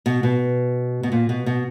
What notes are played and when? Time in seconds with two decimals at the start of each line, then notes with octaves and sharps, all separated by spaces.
0.06 B2
0.23 B2
1.03 B2
1.12 A#2
1.29 B2
1.46 B2